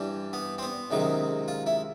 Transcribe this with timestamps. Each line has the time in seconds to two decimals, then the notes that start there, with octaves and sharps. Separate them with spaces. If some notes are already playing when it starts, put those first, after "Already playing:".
Already playing: G2 E3 G3
0.33 B3
0.58 C4
0.63 B3
0.91 C#2 C3 D#3 F#3
1.48 F4
1.66 E4